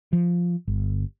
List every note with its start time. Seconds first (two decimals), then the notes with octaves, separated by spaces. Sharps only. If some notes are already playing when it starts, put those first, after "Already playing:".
0.13 F3
0.68 G1